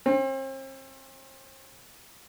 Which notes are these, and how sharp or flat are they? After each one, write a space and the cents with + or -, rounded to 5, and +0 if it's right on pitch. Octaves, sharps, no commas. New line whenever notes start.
C4 +40